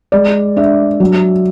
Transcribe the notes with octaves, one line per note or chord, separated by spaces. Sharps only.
G#3 D5
D4 E5
F#3